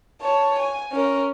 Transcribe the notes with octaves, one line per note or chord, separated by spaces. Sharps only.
C#5 A5
G#5
C#4 A#4